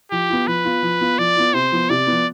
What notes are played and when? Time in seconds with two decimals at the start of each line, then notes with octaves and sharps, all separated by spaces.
0.11 F3 G4
0.29 B3 F4
0.47 F3 B4
0.65 B3 F4
0.83 F3
1.01 B3 F4
1.18 F3 D5
1.36 B3 F4
1.53 C3 C5
1.72 F3 B3
1.90 C3 D5
2.07 F3 B3